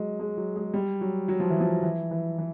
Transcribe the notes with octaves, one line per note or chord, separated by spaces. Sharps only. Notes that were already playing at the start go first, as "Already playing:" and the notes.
Already playing: F#3 G#3
G#3
F#3
G#3
G3
F#3
F#3
F3
E3
F3
E3
E3
E3